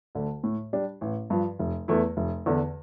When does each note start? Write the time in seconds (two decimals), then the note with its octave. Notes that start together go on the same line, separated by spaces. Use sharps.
0.15 D2 D3
0.43 A2
0.73 G3 D4 G4
1.01 A1
1.30 G2 F3
1.59 F1
1.88 E2 E3 A3 E4
2.17 F1
2.46 E2 D3